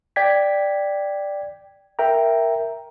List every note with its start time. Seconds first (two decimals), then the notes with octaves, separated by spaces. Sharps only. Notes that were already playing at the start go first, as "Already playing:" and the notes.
0.16 D5 G5 G#6 B6
1.99 A#4 E5 G5 A#5